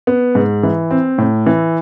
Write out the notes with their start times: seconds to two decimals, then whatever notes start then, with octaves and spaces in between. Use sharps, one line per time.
0.07 B3
0.35 G#2
0.63 E3
0.91 C4
1.18 A2
1.46 E3